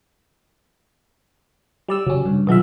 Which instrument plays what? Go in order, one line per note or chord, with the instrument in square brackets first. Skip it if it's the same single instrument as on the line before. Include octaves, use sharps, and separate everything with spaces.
[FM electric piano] G3 D5 E6
[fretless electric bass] C#3 [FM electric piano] F#3 C#4
[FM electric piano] G2 [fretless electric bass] D4
[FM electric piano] D#2 G#3 E5 [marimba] B2 F#3 F4